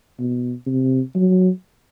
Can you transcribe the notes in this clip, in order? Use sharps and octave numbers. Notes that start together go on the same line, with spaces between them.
B2
C3
F#3